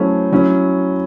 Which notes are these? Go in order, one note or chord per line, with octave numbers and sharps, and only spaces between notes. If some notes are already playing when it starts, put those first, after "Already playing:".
Already playing: F#3 A3 C#4 E4 C5
F#3 C#4 E4